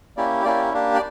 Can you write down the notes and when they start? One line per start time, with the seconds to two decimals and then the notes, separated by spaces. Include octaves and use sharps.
0.17 A#3 C#4 E4 G4 D5
0.45 A#3 C#4 E4 G4 D5
0.73 A#3 D4 G4
0.94 D5